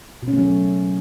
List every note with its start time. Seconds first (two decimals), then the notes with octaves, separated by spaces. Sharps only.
0.23 B2
0.28 C#4
0.33 A3
0.38 F#3